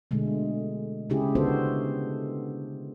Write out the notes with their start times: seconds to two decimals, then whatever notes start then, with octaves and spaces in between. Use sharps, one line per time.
0.11 B2 D3 G#3 A3
1.10 C#3 G#3 C#4 E4 G4 G#4
1.35 D3 B3 D4 F#4 A4 C5